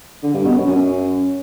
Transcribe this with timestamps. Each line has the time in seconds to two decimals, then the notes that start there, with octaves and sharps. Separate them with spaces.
0.23 D3
0.34 G2
0.45 B2
0.56 F#2
0.67 F#2